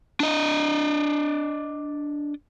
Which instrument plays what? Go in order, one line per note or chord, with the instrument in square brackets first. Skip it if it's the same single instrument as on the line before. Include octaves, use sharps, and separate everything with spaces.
[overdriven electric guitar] D4 D#5